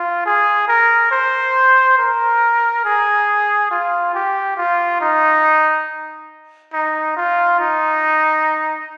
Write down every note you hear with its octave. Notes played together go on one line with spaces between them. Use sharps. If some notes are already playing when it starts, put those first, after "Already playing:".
Already playing: F4
G#4
A#4
C5
A#4
G#4
F4
G4
F4
D#4
D#4
F4
D#4